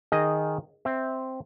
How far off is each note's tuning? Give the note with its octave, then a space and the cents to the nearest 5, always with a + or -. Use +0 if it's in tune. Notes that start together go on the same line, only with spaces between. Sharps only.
D#3 +0 G#4 +0 D#5 +0
C4 +0 E5 -10